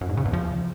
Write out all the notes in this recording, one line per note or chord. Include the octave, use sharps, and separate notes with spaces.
F#2
G#2
C#3
E2
F3